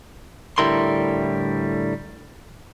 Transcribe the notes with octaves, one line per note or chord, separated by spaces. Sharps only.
A2 D3 G3 E4 A#4 C6